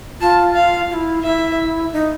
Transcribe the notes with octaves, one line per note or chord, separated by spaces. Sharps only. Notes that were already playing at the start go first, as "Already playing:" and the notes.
F4 A5
F5
F4
E4
E4 E5
D#4